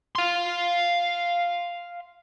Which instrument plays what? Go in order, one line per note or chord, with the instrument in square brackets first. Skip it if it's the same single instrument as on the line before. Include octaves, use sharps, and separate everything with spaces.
[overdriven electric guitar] F5 C6